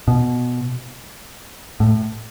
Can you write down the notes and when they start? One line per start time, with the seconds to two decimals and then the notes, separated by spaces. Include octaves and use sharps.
0.08 B2
1.80 A2